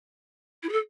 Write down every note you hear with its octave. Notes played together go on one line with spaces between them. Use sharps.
E4
G#4
A4